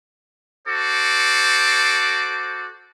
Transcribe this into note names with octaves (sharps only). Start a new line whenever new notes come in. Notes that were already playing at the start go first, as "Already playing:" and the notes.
F#4 A4 C5 D6